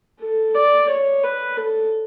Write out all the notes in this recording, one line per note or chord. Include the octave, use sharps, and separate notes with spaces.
A4
D5
C#5
B4
A4